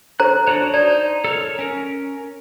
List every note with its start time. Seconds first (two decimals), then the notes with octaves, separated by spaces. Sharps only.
0.20 A4 C5 A#5 F#6
0.47 D4 F#4 C#5
0.74 D#4 C5 D5
1.24 A4 A#4 C#5
1.59 C#4 A#4